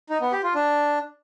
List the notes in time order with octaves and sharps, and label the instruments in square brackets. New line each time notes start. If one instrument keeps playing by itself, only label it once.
[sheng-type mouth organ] D#4
B3
G4
F4
D4